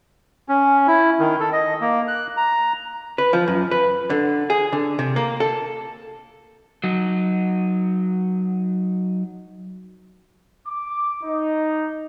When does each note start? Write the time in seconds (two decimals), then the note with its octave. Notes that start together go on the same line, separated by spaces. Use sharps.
0.49 C#4
0.87 E4
1.20 D#3
1.40 A4
1.53 D#5
1.81 A#3
2.08 F#6
2.37 A#5
3.18 B4
3.33 F3
3.48 F#2
3.71 B4
4.10 D3
4.50 G#4
4.73 D3
4.99 C3
5.16 A#3
5.40 A4
6.84 F#3 D#4
10.68 D6
11.24 D#4